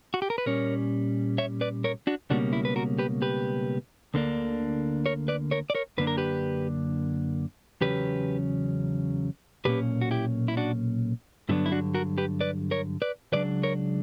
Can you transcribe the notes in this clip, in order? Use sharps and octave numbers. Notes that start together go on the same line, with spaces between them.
F#4
G4
A#4
B4
A#2 G3 C#4 A#4 C#5
C#5 E5
B4 D5
A#4 C#5
D4 F#4
C#2 B2 G3 A#3 C#4 D4 F#4
E4
B4
F#4 A#4
G4 B4
G4 B4
D2 D3 A#3 D4
A#4 C#5
B4 D5
A#4 C#5
D5
A#4 C#5
F#2 D3 A#3 D4 B4
A#4
G4 B4
E2 C#3 F#3 C#4 G4 B4
B1 A#2 A#3 C#4 G4 B4
F#4
E4 G4
E4
D4 F#4
G2 D3 F#3 B3 D4 E4
E4
D4 F#4
F#4 A#4
G4 B4
B4 D5
A#4 C#5
B4 D5
C#2 C#3 F#3 D4 B4 D5
A#4 C#5